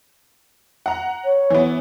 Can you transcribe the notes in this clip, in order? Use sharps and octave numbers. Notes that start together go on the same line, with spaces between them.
F#5 A#5
C#5
E3 B3